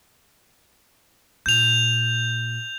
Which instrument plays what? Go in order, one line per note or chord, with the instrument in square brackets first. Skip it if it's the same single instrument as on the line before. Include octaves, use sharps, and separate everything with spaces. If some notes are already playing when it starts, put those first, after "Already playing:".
[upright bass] A#2 [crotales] G6 F7